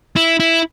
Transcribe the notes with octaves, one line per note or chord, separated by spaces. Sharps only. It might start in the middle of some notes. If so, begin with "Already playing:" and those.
E4
E4